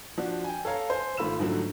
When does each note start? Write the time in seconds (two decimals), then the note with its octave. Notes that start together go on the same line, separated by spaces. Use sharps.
0.18 F3 D4 F#4
0.44 G5 G#5
0.65 A4 C#5 F5 A#5
0.90 C5 G#5
1.17 G#1 A3 F4 B5 E6 E7
1.39 G#2 D3 F3 F#3 A3